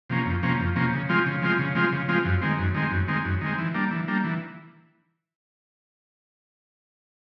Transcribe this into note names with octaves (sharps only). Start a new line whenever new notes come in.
C3 F3 A#3 C#4
F2
C3 F3 A#3 C#4
F2
C3 F3 A#3 C#4
C#3
F3 G#3 C4 F4
C#3
F3 G#3 C4 F4
C#3
F3 G#3 C4 F4
C#3
F3 G#3 C4 F4
F#2
D#3 G#3 C4
F#2
D#3 G#3 C4
F#2
D#3 G#3 C4
F#2
D#3 G#3 C4
E3
G3 A#3 D4
E3
G3 A#3 D4
E3